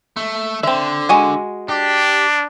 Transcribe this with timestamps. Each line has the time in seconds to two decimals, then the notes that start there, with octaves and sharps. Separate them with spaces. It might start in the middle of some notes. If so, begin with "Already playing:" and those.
0.17 A3
0.63 D3 C4 E5
1.09 G#3 F#4 G#5
1.69 D4 G4